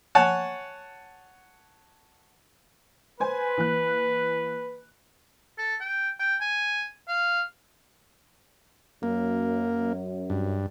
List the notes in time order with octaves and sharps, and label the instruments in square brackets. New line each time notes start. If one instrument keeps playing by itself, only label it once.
[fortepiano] C#5 F#5 G#5 A5
[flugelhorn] B4 [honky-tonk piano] C5 G#5
[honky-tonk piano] E3 A#3 F#6
[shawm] A4
G5
G5
G#5
F5
[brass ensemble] F#2 [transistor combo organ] A#3
[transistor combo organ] G2